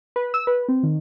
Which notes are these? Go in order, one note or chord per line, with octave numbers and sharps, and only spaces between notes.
B4
E6
B4
C4
D#3